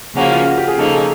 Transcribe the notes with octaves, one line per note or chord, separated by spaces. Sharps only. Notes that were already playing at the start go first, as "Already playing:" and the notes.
C#3 F3 A#3 C#4 F#4
F4
F#4
G4
G#4
C#3 F3 A#3 D#4 A4
G#4